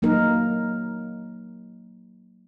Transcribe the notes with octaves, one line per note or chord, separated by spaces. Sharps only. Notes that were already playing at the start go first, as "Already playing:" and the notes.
F#3 A#3 D#4 A#4